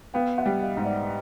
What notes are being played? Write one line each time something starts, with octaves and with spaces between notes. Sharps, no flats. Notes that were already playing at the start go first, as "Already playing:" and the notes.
B3 F5 G5
E5 F#5
G3
D#5 F5
G#2 D#5
D5 E5